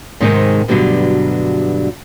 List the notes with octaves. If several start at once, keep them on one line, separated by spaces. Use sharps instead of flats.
G#2 C3 D#3 G#3 C4 D#4
D2 G2 B2 D3 F#3 G3